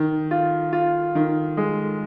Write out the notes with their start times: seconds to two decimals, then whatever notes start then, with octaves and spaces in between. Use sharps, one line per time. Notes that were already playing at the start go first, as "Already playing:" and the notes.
Already playing: D#3
0.31 F4
0.73 F4
1.15 D#3
1.57 G#3